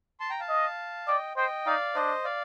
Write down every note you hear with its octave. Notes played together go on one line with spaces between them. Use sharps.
A5 C6
G5 A#5
F5 A5
D#5
D5 D#5 G5
C5 D#5 G5
D#4 D5 F5
D4 C5 D#5
D5 F5